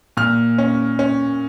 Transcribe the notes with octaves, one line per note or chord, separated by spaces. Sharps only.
A#2 F6
C#4
C#4